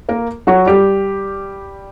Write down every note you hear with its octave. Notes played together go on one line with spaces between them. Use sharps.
A#3 A#4
F#3 F#4
G3 G4